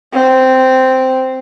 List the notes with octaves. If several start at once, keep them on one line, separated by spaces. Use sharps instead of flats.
C4